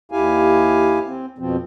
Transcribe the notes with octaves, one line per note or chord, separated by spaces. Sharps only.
D#2 E4 G4 F5 G#5
C4
F2 B2 F3 C4